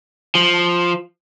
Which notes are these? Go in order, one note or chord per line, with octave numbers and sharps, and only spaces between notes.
F3